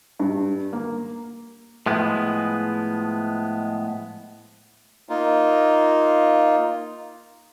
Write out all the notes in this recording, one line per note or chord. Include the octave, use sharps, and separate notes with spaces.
G2
A#3
A2 F3 G#3 B3
A#3 D#4 F4